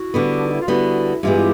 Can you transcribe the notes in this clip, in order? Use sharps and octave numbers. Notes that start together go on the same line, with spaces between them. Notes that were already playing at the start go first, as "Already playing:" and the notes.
Already playing: E4 F#4
D3 G3 B3
D4
D#4
E4
F4
D3 G3 B3 E4 F#4
G2 E3 G#3 B3 F4 G4